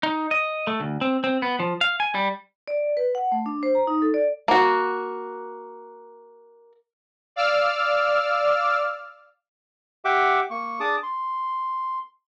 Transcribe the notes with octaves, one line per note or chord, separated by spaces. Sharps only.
D#4
D#5
A3
D2
C4
C4
B3
F3
F5
G#5
G3
D5
B4
F#5
A3
D4
C5
A#5
D#4
A4
D5
A#3 F#4
D5 F5 D6 E6 F6
G4 E5 F#5 G5 D6
A#3 C#6
D4 G#4 A5 D6 D#6
C6